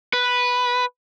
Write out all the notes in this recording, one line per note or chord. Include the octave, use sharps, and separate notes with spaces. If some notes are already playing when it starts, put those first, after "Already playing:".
B4